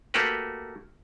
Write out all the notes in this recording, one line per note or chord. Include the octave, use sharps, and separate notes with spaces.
A3 A#3 F#4 G4 B4